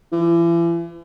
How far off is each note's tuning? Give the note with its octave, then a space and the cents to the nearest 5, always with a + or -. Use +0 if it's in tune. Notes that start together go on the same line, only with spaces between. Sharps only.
E3 +40